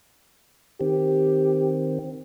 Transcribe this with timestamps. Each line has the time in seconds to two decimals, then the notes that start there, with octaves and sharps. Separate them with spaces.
0.81 D#3 C4 G4